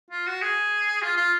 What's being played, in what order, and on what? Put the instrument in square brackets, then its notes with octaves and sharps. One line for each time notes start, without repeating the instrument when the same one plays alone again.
[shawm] F4
F#4
G#4
F4
F4